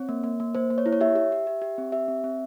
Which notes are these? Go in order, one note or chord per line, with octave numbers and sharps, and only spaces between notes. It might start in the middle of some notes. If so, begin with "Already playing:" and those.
Already playing: C4 C#5
A#3
A#3
A#3
A#3 C5
A#3
C#5
E4
C#5
G4 E5
G4
G4
G4
G4
C4
G4 E5
C4
C4